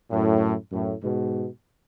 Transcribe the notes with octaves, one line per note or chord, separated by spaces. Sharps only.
F#2 A2
F#2 A2
G#2 B2